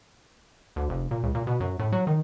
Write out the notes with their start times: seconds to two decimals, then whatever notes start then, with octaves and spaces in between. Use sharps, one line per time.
0.76 D2
0.89 F1
1.11 A#2
1.23 C#2
1.35 A#2
1.47 B2
1.60 F#2
1.79 A2
1.92 F#3
2.07 D#3